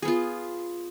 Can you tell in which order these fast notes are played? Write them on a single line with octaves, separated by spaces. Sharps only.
G#4 B3 F4